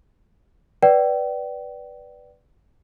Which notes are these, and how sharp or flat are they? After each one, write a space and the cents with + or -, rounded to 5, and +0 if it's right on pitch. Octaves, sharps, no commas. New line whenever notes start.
B4 +0 D5 +0 G5 -35